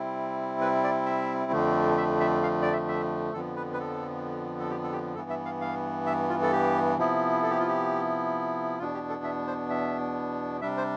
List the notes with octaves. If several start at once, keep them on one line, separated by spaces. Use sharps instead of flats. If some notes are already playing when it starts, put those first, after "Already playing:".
Already playing: C3 G3 C4 E4
B4
D5
E5
F2 D3 F3 A3
E5
E5
F5
D5
E5
E5
F2 D3 F3 B3 A4
B4
B4
A4
A4
G4
A4
G4
G2 E3 B3 A4
E5
F5
F5
E5
F4
A4
G4
C3 F3 B3 E4
A4
G4
F4
G4
E2 B2 B3 D4 F4
G4
A4
E5
C5
E5
C3 G3 D4 E5
C5